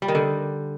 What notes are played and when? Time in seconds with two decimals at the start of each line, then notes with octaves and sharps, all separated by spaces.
0.02 G3
0.08 D#3
0.15 D3